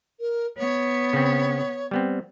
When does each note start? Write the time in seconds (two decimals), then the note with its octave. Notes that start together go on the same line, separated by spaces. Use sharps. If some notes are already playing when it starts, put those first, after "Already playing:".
0.20 A#4
0.57 B3 C#5
1.13 C#3 C4
1.91 G3 B3 C4